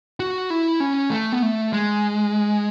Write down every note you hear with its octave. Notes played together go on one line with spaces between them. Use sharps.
F#4
E4
C#4
A3
B3
A3
G#3